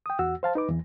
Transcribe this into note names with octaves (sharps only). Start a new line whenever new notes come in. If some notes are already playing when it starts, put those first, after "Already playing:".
G5 D#6
E2 F#4 F#5 E6
C5 F5 A5
D#4 B4 D6
E2 E3